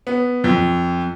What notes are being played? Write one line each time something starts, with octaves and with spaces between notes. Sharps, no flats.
B3
F2